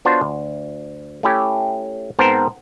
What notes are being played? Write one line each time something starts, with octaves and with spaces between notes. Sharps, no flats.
B3 D4 F4 F#4 C5 C#5
D2
A3 C#4 E4 G4 C#5
G#2 B3 C4 A#4 C5 A5